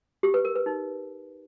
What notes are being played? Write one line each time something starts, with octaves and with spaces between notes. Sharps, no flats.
G4
B4
A#4
B4
D#4